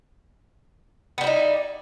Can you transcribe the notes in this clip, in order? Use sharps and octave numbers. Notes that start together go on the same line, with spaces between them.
G3 B3 D#4 E4